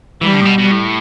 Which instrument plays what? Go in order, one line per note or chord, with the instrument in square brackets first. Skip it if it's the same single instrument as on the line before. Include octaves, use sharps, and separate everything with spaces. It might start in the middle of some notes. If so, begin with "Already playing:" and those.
[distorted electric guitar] E3 [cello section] G3
[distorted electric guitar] D3
A2
B2
B2
A2